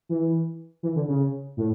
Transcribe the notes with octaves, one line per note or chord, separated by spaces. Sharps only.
E3
E3
D3
C#3
A2